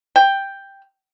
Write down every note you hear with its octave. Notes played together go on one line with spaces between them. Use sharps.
G5